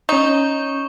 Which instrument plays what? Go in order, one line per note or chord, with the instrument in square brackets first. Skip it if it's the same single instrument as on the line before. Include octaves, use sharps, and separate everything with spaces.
[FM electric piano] C#4 G6 [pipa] D#4 [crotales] C#6